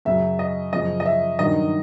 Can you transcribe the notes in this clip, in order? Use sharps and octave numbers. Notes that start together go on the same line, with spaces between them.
F#2 C#3 F#3 E5
D#5
F#2 C#3 F3 D#5
D#5
E5
G2 D#3 F#3 D#5